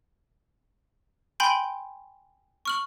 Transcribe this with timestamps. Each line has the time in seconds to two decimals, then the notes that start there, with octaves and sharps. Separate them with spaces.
1.40 G5 G#5 B5 C6 G6 D7
2.65 C#6 F6 F#7